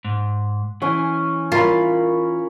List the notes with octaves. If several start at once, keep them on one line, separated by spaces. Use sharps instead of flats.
G#2
E3 C#4 G#5
F4 A#4 C#5 B5